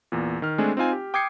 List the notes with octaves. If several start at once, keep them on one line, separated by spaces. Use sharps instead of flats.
E2 A#2
D#3 F6
G#3 A3 C4 D4 G#4
C4 D#4 F4 G#5
G4
G5 D6 D#6 G#6 C7 C#7